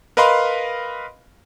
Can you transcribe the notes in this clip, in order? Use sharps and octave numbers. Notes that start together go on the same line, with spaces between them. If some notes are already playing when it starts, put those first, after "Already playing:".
A#4 B4 D#5 F5 B5 C6